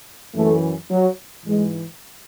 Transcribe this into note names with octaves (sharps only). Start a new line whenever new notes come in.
F#2 E3 A3
F#3
G#2 E3 G#3